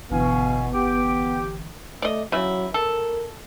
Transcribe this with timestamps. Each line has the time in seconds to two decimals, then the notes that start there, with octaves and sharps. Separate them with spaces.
0.11 G1 B2 D3 E3 B3 F5 G#5
0.74 G4 D6
2.02 A3 D5 D#5
2.32 C#3 F#3 E4
2.74 A4 A#4